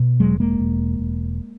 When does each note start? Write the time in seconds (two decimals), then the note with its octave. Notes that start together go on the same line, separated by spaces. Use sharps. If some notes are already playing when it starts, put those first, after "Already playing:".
Already playing: B2
0.20 E1 F#3 G#3
0.40 G#3 A#3
0.59 E1
0.99 E1